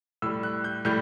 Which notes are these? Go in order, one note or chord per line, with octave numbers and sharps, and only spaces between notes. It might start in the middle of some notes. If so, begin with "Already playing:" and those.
A2 G3 E6
F#6
G6
A2 G3 G6